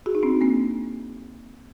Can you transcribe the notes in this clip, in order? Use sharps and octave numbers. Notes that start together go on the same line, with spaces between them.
F#4 G#4
D#4
C4 D4
A#3 C4